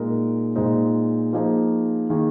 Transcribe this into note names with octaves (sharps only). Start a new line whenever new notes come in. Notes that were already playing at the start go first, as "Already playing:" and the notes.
Already playing: A#2 G#3 D#4 A#4
A#2 G#3 D#4 C5
F3 A#3 D#4 G#4 C5
D#3 A#3 G#4